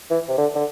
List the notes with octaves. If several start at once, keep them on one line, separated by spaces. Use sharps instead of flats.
E3
C3
D3
D3